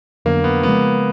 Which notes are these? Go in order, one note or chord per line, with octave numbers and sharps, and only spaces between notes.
F2 D3 F#3 A#3 B3 D4
B3
C#3 F3 G#3 B3